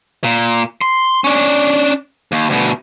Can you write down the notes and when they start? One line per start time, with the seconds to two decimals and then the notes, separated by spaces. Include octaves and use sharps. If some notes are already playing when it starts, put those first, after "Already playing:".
0.24 A#2
0.81 C6
1.24 C#4 D4
2.32 D#2
2.50 D2 B2